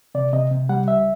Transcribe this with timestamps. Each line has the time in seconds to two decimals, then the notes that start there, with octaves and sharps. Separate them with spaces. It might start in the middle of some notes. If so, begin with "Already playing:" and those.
0.15 C3 D5
0.33 C3 D#5
0.51 C3
0.69 G3 F#5
0.88 C#2 E5